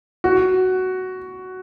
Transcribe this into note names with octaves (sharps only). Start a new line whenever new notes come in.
F#4